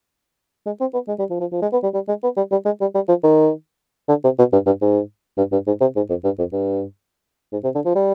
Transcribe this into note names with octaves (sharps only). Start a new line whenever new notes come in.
G#3
C4
B3
G#3
G3
F3
F3
F3
G#3
B3
G3
G3
G#3
B3
G3
G3
G#3
G3
G3
F3
D#3
D3
C3
B2
G2
G2
G#2
G2
G2
G#2
C3
G#2
F2
G2
F2
G2
G#2
C3
D3
F3
G3